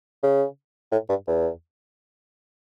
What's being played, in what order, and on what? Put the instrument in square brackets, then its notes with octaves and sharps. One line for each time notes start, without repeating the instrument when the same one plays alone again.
[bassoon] C#3
A2
G2
E2